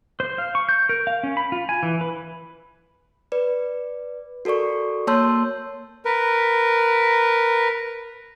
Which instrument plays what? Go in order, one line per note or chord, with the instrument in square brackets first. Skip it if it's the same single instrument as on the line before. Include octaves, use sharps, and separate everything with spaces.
[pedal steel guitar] C5
F5
C#6
G6
A#4
F5
C#4
B5
F4
G#5
E3
B4
[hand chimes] B4 D5
F#4 A4 A#4 D5 C#6
A#3 C#5 A5 C6 E6 G6
[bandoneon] A#4 B4